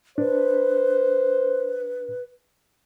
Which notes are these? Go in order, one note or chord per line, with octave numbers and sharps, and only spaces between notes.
D4 B4 C5